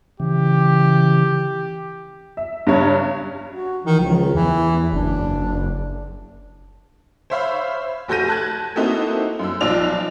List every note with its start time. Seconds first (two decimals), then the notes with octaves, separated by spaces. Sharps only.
0.20 C#3 E3 G4
2.37 E5
2.67 G2 C#3 C#5 A#5
3.50 F#4
3.85 D#3 E3
4.00 C#2 F3
4.34 E2 E3
4.93 F#1 D4
7.30 C5 C#5 E5 F5 B5
8.08 F1 F#4 A4 G6 A#6 D#7
8.28 A5 F#6 G#6
8.76 A#3 C4 D#4 E4 F#4 A4
9.39 F#2 E6
9.61 B1 F3 D#4 F4 D5 F7